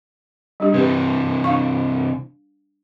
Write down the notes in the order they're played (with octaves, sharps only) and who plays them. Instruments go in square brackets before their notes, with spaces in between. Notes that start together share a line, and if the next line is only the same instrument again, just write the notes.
[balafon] G3 D4 G4
[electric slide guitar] C3 E3 [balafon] G4 B4
[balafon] D4 F5 C#6